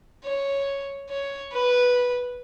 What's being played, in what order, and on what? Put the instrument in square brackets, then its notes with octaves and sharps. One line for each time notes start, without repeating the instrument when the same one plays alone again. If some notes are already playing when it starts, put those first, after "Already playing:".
[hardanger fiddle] C#5
C#5
B4